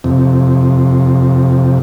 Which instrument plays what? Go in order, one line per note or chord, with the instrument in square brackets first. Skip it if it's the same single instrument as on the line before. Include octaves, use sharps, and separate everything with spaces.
[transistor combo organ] F2 C3